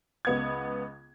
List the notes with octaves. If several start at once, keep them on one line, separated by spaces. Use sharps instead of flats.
C#2 B3 G#6